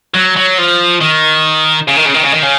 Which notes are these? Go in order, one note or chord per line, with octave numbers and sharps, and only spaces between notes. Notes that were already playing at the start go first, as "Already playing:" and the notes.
F#3
F#3
F3
D#3
C#3
D#3
C#3
D#3
C#3
D#3
C#3